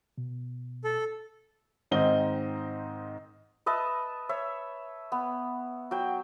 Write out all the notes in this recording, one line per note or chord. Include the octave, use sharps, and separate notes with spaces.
B2
A4
G#2 D#3 C4 D#4 D#5 G7
B4 D#5 E5 A5
C#5 E5
B3
F#3 G5